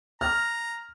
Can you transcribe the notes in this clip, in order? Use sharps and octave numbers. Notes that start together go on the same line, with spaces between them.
A#5 F6